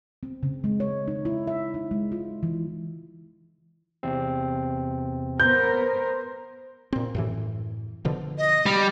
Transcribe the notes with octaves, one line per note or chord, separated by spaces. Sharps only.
C4
C#3
G#3
C#5
D#4
E4
E5
D#4
G#3
F4
E3
E2 C3 C4
B3 A#4 C5 G6
A#2 C4
F#2 A2 E3
B2 D3 F3
D#5
G3